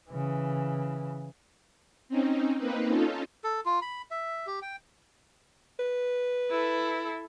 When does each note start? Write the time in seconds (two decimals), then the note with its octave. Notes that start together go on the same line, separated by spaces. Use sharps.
0.11 C#3 E3
2.09 C4 C#4 D#4
2.58 A#3 C4 D#4 B4
2.87 C#4 D#4 F4 A4
3.44 A4
3.66 F4
3.82 B5
4.11 E5
4.47 G4
4.62 G5
5.79 B4
6.50 E4 A4